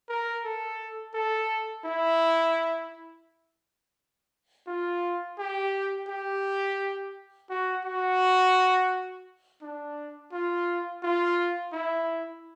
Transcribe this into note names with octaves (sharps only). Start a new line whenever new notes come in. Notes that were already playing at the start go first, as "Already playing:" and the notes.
A#4
A4
A4
E4
F4
G4
G4
F#4
F#4
D4
F4
F4
E4